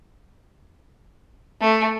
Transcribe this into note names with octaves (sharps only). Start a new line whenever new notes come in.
A3